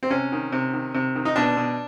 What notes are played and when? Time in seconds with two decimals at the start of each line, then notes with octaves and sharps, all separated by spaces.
0.03 C4
0.10 C3 C#4
0.32 D#3
0.52 C3
0.73 D#3
0.95 C3
1.15 D#3
1.25 D#4
1.36 B2 D4
1.57 B2